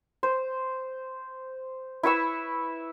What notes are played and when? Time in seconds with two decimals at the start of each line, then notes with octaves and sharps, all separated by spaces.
0.23 C5
2.03 E4 B4 C#6 E6